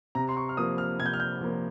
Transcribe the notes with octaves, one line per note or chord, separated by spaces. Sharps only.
C3 A#5
C6
C#6
F6
F3 A#3 D#6
F6
C3 G#6
G6
F6
G6
F3 A#3